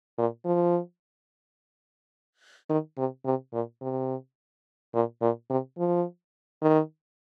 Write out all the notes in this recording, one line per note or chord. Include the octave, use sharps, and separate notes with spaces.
A#2
F3
D#3
C3
C3
A#2
C3
A#2
A#2
C3
F3
D#3